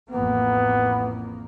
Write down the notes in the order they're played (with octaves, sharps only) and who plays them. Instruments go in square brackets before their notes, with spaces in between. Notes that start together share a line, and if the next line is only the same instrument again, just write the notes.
[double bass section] A1 F2 A#3 [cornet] B3